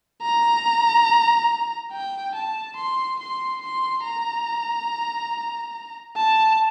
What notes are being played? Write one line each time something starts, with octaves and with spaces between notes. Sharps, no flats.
A#5
G5
A5
C6
C6
C6
A#5
A5